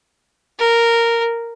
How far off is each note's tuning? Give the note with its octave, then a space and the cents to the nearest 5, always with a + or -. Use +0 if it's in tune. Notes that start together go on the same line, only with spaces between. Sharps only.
A#4 -5